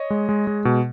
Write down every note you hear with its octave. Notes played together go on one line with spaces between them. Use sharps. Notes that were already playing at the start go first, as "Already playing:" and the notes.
Already playing: C#5 D#5
G#3
G#3
G#3
B2